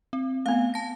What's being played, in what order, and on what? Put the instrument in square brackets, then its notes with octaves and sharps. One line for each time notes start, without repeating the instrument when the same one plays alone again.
[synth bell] C4
[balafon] A3 B3 [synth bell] F5
[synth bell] A5 A#6